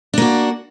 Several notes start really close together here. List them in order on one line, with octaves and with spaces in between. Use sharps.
D4 A#3 F#4